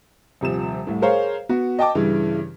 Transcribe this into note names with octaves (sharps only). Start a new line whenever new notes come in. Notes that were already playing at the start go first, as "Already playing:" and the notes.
D#1 C3 F3 E7
C2 A2
G#4 A#4 C5 C#5 F5
B3 F#4
D#5 G5 A5 D6
G2 C#3 E3